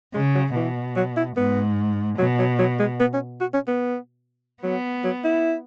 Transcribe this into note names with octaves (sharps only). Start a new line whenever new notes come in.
C#3 G#3
F#3
B2 E3
F#3
E4
G#2 B3
B2 F#3
F#3
F#3
G#3
B3
C#4
F#4
C#4
B3
F#3 B3
F#3
E4